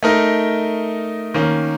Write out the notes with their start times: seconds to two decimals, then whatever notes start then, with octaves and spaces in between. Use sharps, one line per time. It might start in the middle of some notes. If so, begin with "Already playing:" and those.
0.03 A3 D#4 A#4
1.34 D#3 A#3 C#4